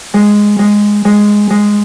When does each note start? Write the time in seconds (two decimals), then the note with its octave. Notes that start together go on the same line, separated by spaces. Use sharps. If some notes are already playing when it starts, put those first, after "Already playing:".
0.14 G#3
0.59 G#3
1.05 G#3
1.50 G#3